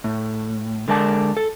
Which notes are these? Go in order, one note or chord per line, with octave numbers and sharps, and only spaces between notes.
A2
D3 G#3 A#4 D5 A5
A4